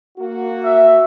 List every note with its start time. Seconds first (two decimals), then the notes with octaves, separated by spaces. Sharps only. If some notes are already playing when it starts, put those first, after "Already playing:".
0.18 A#3 F#4
0.64 E5